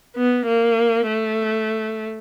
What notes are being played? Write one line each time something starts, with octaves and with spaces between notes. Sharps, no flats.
B3
A#3
A3